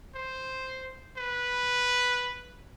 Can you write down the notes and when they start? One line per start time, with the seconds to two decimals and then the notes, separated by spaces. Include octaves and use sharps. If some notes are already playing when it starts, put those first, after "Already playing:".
0.15 C5
1.17 B4